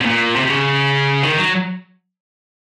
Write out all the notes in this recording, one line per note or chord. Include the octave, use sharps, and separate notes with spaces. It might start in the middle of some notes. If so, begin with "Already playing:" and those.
C3
A#2
C3
C3
C#3
D#3
F#3